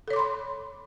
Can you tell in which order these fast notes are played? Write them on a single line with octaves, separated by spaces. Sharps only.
A4 C#5 D6 C6 B5